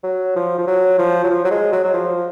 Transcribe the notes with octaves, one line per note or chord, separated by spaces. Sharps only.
F#3
F3
F3
F#3
F3
F#3
F3
F#3
G#3
F#3
F#3
F3